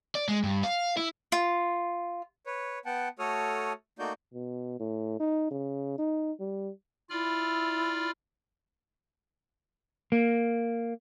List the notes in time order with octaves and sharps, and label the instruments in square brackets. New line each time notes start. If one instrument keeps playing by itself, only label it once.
[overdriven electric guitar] D5
G#3
G2
F5
E4
[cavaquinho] F4
[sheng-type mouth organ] B4 C#5
B3 F#5 G5 A5
A3 F#4 A4 C#5 D#6 F6
A3 A#3 D#4 F#4 D5 G6
[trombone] B2
A2
D#4
C#3
D#4
G3
[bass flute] E4 [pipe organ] F4 D5 F6
[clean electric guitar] A#3